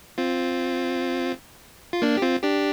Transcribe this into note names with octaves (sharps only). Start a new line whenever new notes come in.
C4 F4
F4
A#3 D4
G4
C4 F4
D4 G4